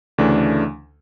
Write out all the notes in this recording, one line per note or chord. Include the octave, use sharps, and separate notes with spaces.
D2 C#3 E3 A3 D4